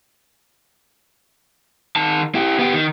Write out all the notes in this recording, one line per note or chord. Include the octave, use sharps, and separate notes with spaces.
D#3 A5
E4 G4
B3 G4
D#3